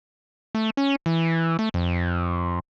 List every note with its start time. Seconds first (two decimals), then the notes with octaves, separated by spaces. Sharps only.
0.55 A3
0.77 C#4
1.06 E3
1.59 A3
1.74 F2